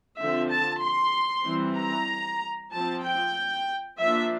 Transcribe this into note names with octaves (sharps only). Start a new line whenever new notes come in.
D3 F3 C4 E5
A5
C6
E3 G3 C4
A#5
F3 C4 A5
G5
F3 A#3 D4 E5